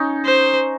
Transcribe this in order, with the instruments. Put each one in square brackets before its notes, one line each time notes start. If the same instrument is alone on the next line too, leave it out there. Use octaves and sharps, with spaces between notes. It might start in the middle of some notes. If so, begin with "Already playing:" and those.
Already playing: [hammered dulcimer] C#4 D#4
[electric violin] C5